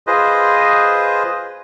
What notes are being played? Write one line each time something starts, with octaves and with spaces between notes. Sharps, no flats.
F4 G#4 B4 C5 D#5